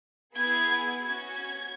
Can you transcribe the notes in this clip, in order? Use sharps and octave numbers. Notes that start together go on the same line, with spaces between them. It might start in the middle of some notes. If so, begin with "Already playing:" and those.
B3 E4 G#4 G#6
C#4 F#4 G#6